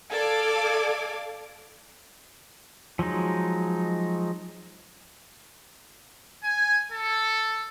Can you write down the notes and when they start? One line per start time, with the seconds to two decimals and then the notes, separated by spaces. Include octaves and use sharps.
0.11 A4 D5 F5 D6 G#6
2.99 F3 F#3 G#3 D#4
6.43 G#5
6.91 A4